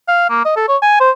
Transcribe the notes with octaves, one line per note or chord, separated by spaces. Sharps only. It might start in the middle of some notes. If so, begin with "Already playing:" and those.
F5
A#3
D#5
A4
C#5
G#5
C5